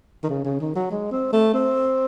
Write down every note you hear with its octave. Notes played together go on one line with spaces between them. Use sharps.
D#3
C#3
C#3
D#3
F#3
G#3
C4
A3
C4